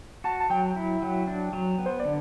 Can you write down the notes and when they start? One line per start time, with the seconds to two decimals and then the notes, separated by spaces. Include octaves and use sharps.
0.24 F#4 A5
0.40 A5
0.50 F#3 G5
0.76 E4
1.02 F#3
1.27 D4
1.53 F#3
1.78 B3
1.86 C5
1.99 D5
2.05 D3